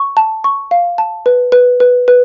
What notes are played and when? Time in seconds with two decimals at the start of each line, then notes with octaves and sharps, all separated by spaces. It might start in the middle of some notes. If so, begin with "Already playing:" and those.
Already playing: C#6
0.17 A5
0.44 C#6
0.71 F5
0.98 A5
1.26 B4
1.52 B4
1.80 B4
2.08 B4